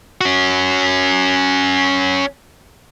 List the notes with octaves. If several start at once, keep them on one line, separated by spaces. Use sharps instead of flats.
C#4 F#4